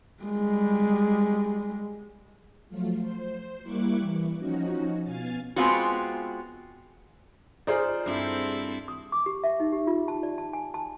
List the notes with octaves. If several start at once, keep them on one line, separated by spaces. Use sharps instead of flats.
G3 G#3
F3 F#3 A3 F4
C5
G3 A#3 E4 C#6 D6 F#6
E3
F3 C#4 D#4 F#4
B2 F5 G#5 F6 A6
G#3 B3 C4 F4 F#4
D#4 F4 G#4 C5 D5
G2 C4 E4 A4
D#6
D6
G4
E5
D#4
G4
F4
A5
D5
A5
G#5
A5